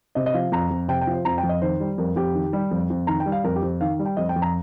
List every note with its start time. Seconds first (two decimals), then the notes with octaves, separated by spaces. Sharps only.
0.15 C3 D#5
0.26 D#5
0.34 F3 F5
0.52 F2 A#5
0.71 F2
0.88 C3 G5
1.01 G5
1.07 F3
1.13 C5
1.25 F2 A#5
1.38 G5
1.44 F2
1.49 D#5
1.62 D#3 C5
1.80 G3
1.98 F2 A#4
2.16 F2 G4
2.35 D#3
2.53 G3
2.71 F2
2.90 F2
3.07 D#3 A#5
3.20 G5
3.26 G3
3.32 F5
3.44 F2 A#4
3.56 G4
3.63 F2
3.81 D#3 F5
3.99 G3
4.05 G5
4.17 F2 D#5
4.29 G5
4.36 F2
4.42 A#5